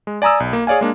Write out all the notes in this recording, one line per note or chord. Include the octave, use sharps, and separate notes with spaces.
G#3
D5 G#5 A#5 D#6 E6
B1
A#3
G#4 C#5 D5 F5 G#5
G#3 A#3 D4